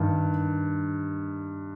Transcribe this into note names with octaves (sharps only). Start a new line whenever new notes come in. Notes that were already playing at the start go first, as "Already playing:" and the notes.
Already playing: G2 D#3